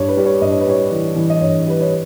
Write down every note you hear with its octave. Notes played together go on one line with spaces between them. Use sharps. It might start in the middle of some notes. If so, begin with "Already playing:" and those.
Already playing: G2 C#5
B4
G3
C#5
G2 D#5
C#5
B4
G3 C#5
E3
E3
D#5
G2 C#5
G3 B4
C#5